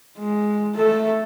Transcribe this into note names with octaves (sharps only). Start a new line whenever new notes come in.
G#3
A3 A4